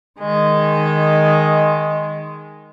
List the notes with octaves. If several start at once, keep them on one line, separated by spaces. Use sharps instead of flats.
D#3 G#3